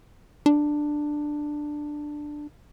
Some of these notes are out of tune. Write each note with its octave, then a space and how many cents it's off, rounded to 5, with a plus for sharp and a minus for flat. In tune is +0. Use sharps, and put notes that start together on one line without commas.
D4 +10